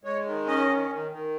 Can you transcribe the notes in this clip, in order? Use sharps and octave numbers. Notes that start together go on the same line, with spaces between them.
G#3 C#5
D#3
C#4 D#5
D#3
D#3
D#3